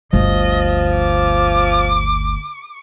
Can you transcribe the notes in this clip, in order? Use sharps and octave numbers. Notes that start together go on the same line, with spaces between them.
G1 D2 F3 D#5
D6